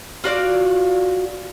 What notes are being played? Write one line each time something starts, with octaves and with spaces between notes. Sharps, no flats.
F4 F#4 D5 F5